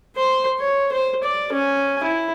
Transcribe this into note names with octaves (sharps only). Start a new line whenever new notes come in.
C5 C6
C#5
C5
D5
C#4 G#5
E4